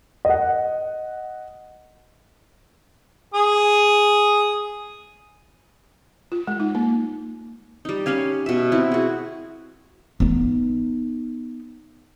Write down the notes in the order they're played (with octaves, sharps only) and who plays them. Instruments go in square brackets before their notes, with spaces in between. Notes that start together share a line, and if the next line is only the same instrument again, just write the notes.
[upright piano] D#5 F#5
[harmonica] G#4 D#6
[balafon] F4
G#3
D#4
A#3
[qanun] G3 D#4
C#4 G4 F5 G#5
B2 E5
C4 E4
F#4 G#4
[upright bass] B3 D#4